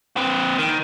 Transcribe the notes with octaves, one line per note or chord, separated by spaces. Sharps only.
C4 B4
D#3